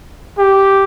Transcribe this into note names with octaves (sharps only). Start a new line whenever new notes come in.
G4